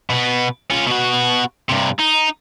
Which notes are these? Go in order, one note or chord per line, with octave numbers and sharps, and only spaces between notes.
B2 B3
C#4 F4
B2 F#4
G2 C3
D#4